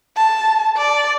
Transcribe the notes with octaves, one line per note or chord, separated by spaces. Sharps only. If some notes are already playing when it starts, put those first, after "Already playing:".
A5
D5